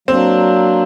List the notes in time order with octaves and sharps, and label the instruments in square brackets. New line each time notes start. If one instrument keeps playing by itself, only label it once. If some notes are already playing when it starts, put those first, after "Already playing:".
[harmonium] F#3 A#3 D4 [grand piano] C4